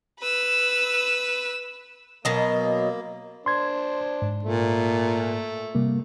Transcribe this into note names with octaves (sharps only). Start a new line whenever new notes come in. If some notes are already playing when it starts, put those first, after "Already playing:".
B4 E6
B2 F#3 A#3 D#5
D4 C5 C6 G#6
G#2
A#2 A3
C3 G3 A#3